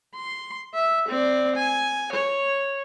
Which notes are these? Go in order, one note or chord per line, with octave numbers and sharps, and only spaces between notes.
C6
E5
C4 D5
G#5
C#5